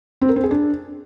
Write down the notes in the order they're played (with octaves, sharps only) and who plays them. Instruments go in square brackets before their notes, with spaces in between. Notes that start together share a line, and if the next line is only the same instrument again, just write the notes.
[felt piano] C4
A#4
C4
G#4
D4